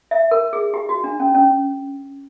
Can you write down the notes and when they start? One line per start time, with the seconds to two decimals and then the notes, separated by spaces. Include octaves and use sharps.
0.11 E5
0.31 A#4
0.53 G#4
0.74 G4
0.89 F#4
1.04 D4
1.20 C#4
1.35 C#4